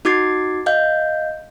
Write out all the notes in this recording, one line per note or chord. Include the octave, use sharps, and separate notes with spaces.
D#4 F#4 D6 G#6 A6 C7
D#5 F5 G6